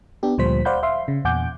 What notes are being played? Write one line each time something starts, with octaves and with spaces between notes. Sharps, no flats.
B3 D4 G4
D2 A#2 F3 G3 C5 B6
C5 D5 F5 F#5 B5 G6
E5 F5 C6
C#3
E2 A#2 F#5 G#5 D6 G6